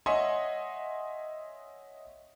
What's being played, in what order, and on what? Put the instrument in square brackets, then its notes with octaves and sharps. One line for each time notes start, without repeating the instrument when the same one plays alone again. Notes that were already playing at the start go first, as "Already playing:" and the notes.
[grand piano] C#5 D#5 E5 F#5 G#5 C6